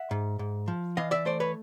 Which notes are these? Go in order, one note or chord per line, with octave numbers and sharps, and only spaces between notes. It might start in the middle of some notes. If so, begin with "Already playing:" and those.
Already playing: E5 F#5
G#2
G#2
F3
E3 D#5 F5
D5 E5
A3 C5 D5
B4 C#5